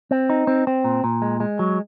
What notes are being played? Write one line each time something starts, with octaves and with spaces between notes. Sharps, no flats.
C4
D#4
C4
C4
A#2
A#2
G#3
G#3
F#3